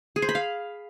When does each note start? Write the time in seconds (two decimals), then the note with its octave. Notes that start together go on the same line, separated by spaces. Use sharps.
0.16 G#4
0.22 C5
0.29 B5
0.35 F5